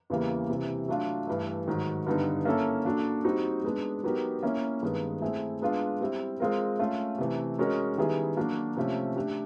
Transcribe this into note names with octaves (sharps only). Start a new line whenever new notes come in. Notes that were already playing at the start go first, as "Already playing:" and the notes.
E2 C#3 E3 G3 A#3
C3 E3 G3
F#3 A3 D4 F4
G2 E3 A3
G#2 D#3 F#3
G2 D3 G3 B3 D#4
A#3 C#4 E4 A4
A#3 D4 F#4 A4
G3 C4 D#4 F#4
G#3 B3 D4
F#3 B3 D#4 G4 A#4
A#3 C#4 E4
G2 D#3 G#3 B3
A3 C4 E4 G#4
G#3 B3 D4 F4
G3 C4 E4
G#3 C4 F4 A#4
A3 C#4 F4
C3 E3 A3
G#3 C#4 F#4 A#4 D#5
D#3 G3 B3 E4 G#4
F#3 A#3 D4 F#4
C3 F3 A3 C#4
A3 D4 G4